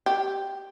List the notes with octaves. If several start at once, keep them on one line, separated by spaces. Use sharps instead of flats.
G4